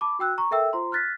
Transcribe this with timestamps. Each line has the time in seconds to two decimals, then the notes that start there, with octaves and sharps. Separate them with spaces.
0.01 A5 B5 D6
0.19 F#4 G5 E6 F#6
0.38 A#5 C#6
0.51 A4 A#4 E5 G5 E6
0.73 F4 C5 A#5 C6
0.92 F6 F#6 A6 B6